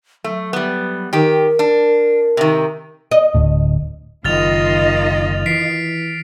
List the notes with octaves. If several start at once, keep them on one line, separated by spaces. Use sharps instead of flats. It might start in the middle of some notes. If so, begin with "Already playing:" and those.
F#3 A3
G3 B3
D#3 G4 A#4
D4
C3 D#3
D#5
D1 D2 A2
F#1 D#3 F4 D#5 F6 A6 F7
E3 B6 C7 D7